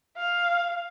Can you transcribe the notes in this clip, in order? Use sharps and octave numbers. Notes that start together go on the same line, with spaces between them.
F5